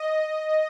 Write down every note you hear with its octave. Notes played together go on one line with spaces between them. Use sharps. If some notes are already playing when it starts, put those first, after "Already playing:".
Already playing: D#5